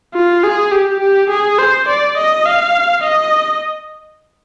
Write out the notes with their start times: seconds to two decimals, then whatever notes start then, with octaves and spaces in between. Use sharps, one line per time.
0.14 F4
0.43 G#4
0.72 G4
1.00 G4
1.30 G#4
1.59 C5
1.88 D5
2.17 D#5
2.46 F5
3.03 D#5